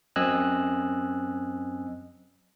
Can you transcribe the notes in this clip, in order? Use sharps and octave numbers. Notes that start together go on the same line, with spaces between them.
F#2 C4 D#5 G#5 E6 F#6